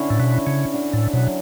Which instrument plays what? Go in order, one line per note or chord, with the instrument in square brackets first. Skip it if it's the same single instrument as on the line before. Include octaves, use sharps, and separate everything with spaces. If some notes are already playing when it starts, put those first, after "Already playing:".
Already playing: [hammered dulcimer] D3 C#4 E4
[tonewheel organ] A2
B2
[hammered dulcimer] E4
[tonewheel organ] C#3
[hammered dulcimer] D3
[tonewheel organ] A2
[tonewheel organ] B2 [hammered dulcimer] F#3